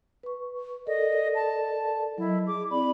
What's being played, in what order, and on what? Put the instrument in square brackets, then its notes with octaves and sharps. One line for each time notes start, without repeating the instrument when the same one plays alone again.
[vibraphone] B4 C#6
[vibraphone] A4 A#4 D5 [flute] D#5
[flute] A5
[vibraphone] F#3 D#5 [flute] E4
[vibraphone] G#4 [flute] D6
[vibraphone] C4 E4 D5 [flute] B5